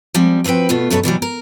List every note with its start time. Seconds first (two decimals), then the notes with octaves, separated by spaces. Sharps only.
0.14 F3 G3 G#3 C4
0.44 F3 C4 F#4 B4 G5
0.69 B2 A3 B3 F4
0.90 F#2 B2 A3 A4 B4 C#5
1.03 B2 E3 F#3 G3
1.22 A#4